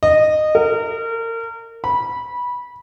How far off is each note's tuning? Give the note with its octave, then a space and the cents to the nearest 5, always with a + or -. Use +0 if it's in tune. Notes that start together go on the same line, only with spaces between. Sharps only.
D#5 -15
A#4 -30
B5 -15